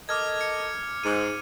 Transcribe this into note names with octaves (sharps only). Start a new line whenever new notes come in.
A4 A#4 D#5 D6 F6 G#6
C#7
G#2 D#7